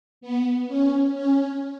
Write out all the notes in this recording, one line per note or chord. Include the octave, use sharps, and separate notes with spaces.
B3
C#4
C#4